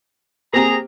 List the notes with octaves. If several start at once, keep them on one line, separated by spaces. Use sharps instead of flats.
A#3 C4 G4 G#4 A#5